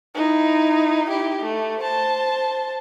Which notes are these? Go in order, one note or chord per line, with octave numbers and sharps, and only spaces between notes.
D#4 E4
E4 G4
A3
C5 A5